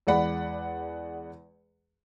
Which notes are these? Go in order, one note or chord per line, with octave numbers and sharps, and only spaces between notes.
E2 G#3 D5 F#5 B5